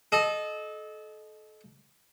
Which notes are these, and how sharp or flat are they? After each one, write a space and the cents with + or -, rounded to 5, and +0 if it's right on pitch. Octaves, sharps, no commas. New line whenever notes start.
A4 -30 D#5 -10